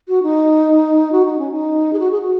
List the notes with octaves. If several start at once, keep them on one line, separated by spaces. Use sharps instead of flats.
F#4
D#4
F#4
D#4
C#4
D#4
G#4
F#4
G#4
F#4